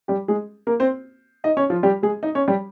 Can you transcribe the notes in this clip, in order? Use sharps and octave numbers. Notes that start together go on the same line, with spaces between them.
G3 G4
G#3 G#4
A#3 A#4
C4 C5
D#4 D#5
C#4 C#5
F3 F4
G3 G4
G#3 G#4
D#4 D#5
C#4 C#5
G3 G4